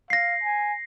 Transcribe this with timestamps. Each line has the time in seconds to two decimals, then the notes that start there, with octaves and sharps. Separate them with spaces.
0.10 F5 A#6 C7
0.44 G#5